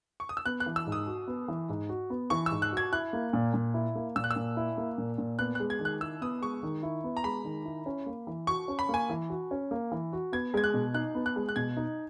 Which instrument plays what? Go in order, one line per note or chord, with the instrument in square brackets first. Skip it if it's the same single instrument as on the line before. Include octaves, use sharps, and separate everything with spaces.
[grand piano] C#6
D#6
E6
[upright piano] B3 [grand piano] F#6
[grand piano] F#6
[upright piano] E3
[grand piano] E6
[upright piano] G#2
[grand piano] D#6
[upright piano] F#4
B3
E3
G#2
F#4
B3
[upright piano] E3 [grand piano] C#6
[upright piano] G#2 [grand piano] E6
[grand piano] F#6
[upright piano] F#4 [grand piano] G#6
[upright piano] E4 [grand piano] F#6
[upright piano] A#3
A#2
A#2
E4
A#3
[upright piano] A#2 [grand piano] E6
[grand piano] F#6
E6
[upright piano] A#2
E4
A#3
A#2
A#2
[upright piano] B3 [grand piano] F#6
[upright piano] G#3 [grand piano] F#6
[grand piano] G#6
[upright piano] D#3
[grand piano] F#6
[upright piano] E4 [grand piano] E6
[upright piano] B3 [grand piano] D#6
[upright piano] G#3 [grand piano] C#6
[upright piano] D#3
E4
B3
[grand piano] A#5
[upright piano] G#3 [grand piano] B5
[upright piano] D#3
E4
C#4
A#3
E3
[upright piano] F#4 [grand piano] C#6
[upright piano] C#4
[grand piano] B5
[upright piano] A#3 [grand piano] G#5
[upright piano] E3
F#4
C#4
A#3
E3
F#4
[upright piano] B3 [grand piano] G#6
[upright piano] G#3 [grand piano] G#6
[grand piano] F#6
[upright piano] B2
[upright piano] D#4 [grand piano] F#6
[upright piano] B3
[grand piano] F#6
[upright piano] G#3
[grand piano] F#6
[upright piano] B2 [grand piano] G#6
[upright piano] D#4